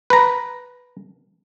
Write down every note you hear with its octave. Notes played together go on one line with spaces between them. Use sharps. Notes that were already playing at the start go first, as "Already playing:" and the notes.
B4 A#5